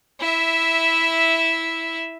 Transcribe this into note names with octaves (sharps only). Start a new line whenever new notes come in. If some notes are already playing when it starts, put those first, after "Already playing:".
E4 E5